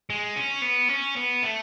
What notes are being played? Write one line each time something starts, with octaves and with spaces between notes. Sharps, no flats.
G#3
C#4
B3
C#4
B3
A3